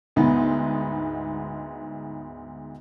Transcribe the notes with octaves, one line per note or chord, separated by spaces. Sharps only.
D2 G#2 B3 D#4